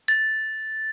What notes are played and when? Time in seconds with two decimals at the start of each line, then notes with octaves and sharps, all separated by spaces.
0.08 A6